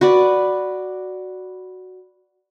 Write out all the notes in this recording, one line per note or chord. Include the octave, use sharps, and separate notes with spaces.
F#4 B4 D5